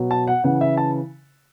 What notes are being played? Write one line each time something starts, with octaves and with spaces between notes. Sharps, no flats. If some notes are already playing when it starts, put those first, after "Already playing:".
Already playing: B2 F#3
A5
F#5
C#3 E3 F#5
E5
A5